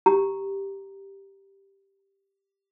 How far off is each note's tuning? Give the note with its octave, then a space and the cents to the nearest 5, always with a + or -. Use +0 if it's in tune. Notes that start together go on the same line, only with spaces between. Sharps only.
G4 +0 A#5 +0